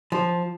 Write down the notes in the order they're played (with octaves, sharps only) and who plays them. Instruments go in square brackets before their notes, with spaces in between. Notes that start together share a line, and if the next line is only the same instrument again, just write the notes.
[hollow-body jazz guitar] F3